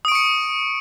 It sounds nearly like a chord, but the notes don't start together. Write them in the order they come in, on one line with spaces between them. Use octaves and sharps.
D#6 D7 C#6 C#7